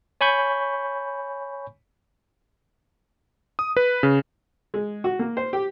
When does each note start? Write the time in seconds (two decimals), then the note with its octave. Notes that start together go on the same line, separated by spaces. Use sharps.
0.21 C#5 G#5 B5 C#6 G6
3.59 D#6
3.77 B4
4.03 C#3
4.74 G#3
5.04 F#4
5.19 A#3
5.37 C5
5.53 G4